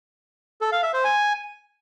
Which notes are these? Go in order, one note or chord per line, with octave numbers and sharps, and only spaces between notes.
A4
F5
E5
C5
G#5